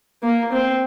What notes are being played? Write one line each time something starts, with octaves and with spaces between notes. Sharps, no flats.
A#3
C4